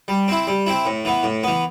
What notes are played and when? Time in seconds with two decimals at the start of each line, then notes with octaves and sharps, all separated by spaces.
0.08 G3
0.28 C4 E4
0.47 G3
0.66 C4 E4
0.86 A2
1.05 E3 B3
1.23 A2
1.43 E3 B3